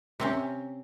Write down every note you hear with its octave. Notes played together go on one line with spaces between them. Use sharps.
C3 C4 C#4